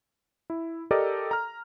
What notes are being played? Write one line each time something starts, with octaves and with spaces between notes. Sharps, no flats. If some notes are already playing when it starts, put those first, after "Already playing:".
E4
G4 A4 A#4 D5 D#5
A#5 F6